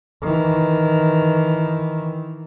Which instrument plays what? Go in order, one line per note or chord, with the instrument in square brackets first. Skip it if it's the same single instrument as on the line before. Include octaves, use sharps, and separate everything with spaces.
[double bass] D#3 E3